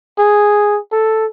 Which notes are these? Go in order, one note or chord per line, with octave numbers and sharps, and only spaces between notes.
G#4
A4